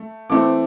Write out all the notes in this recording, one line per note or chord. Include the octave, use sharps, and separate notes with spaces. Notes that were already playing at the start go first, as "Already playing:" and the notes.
Already playing: A3
E3 A3 C4 D6